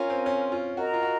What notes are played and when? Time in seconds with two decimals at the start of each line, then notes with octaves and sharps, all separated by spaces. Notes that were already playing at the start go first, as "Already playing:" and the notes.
Already playing: C#4 F4 A#4 F5 G#5 C6
0.10 C4
0.26 C#4
0.52 F4
0.77 F#4 A#4 D#5 A#5
0.93 F4
1.03 F#4